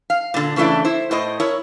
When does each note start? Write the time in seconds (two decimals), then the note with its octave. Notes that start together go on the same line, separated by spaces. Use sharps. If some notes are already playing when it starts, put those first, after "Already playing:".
0.10 F5
0.34 A#2 D3
0.56 C#3 E3 A3 D4 E4
0.85 E4 C5
1.11 A2 C5 D#5
1.40 E4 A#4 C#5